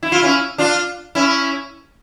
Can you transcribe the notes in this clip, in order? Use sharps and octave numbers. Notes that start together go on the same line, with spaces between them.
E4
F4
C#4 E4
D4 F4
C#4 E4